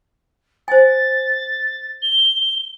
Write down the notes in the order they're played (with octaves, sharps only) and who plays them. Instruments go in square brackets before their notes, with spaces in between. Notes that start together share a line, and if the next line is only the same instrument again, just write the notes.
[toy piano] C5 G#5 [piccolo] A6
[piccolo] G7